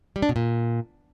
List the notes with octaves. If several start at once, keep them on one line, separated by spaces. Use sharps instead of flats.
G3
D4
B2
A#2